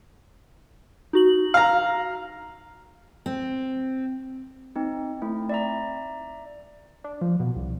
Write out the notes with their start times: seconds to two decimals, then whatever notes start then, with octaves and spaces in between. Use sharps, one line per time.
1.13 D#4 F#4 F#7
1.54 F5 A#5
3.26 C4
4.76 C4 D#4
5.22 A3 C4 E4
5.49 D5 E5 A#5
7.04 D4
7.21 F3
7.40 B2
7.56 C2